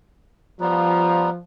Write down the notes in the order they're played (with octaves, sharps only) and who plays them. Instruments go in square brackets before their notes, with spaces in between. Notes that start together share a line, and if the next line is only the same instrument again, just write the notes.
[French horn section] F3 [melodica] G3 B3 [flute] A#5